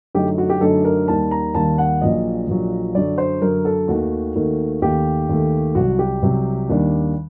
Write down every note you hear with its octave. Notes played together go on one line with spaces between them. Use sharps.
F#2 D3 A3 D#4 G4
F#4
G4
F#2 D3 A3 D#4 A4
A#4
D#2 D#3 G3 A5
A#5
D#2 D#3 G3 A5
F#5
A#1 A#2 F#3 D#5
A#1 A#2 F#3
F#2 D3 F#3 D5
C5
F#2 D3 F#3 A#4
A4
D#2 D#3 A3 F#4
D#2 D#3 A3
D#2 D#3 A3 G4
D#2 D#3 A3
C2 C3 F#3 F#4
G4
C2 C3 F#3
D#2 D#3 G3 D4